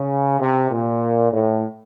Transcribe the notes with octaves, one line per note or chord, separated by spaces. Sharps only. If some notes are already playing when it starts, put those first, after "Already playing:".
Already playing: C#3
C3
A#2
A2